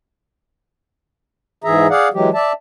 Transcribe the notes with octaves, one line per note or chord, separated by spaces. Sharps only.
G#2 E3 G#4 E5 A#5
G#4 D5 F5 F#5
E3 F#3 G#3 G4
D5 E5 A5